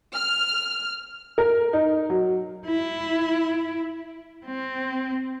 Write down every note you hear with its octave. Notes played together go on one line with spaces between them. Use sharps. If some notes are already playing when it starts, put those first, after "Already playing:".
F6
A#4
D#4
F#3
E4
C4